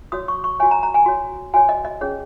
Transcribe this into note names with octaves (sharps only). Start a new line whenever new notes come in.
F#4 C#5 D#6
C#6
C#6
F#4 C#5 G#5
A#5
A#5
G#5
F#4 C#5
F#4 C#5 G#5
D#5
D#5
C#4 G#4 C#5